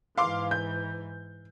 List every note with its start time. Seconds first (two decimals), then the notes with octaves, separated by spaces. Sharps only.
0.18 G#2 E3 F5 C6 D6
0.51 G6